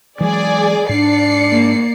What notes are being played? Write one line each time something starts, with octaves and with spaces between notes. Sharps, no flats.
E3 F#3 G#3 G#4 D5
G#2 D4 D5 C7 C#7
A#3